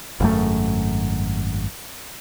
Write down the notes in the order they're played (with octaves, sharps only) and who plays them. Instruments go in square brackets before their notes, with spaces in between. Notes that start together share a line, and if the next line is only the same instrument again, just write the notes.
[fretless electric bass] G#1 F#2 A2 A3